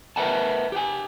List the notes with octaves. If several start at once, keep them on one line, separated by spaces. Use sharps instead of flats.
A#4 B4 E5 F#5 G#5 A5
G4 F#5 G#5